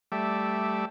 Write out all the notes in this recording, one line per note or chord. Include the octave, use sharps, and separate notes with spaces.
G3 A3 D5 E5